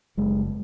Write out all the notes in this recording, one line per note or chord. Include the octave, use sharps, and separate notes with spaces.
F#1 G#3